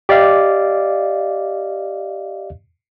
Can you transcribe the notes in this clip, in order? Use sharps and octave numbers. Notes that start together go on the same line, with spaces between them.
G4 D5 D#5 F5